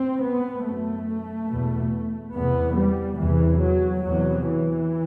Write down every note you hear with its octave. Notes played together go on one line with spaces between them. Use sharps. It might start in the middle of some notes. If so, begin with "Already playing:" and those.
Already playing: C4
B3
F#2 A3
E2 B2
E2 C3 B3
G3
E2 C3 E3
F#3
E2 C3 F#3
E3